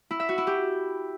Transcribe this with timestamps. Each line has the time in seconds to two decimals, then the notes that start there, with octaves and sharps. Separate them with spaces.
0.11 E4
0.20 E5
0.29 F#4
0.38 E4
0.47 G4